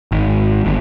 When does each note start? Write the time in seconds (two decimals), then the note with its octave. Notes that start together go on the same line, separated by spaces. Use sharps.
0.12 G#1
0.65 G1